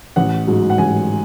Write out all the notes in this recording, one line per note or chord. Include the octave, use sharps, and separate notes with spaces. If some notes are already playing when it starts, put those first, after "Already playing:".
A1 F#5
G#2 F#3
F#5
A1 G#5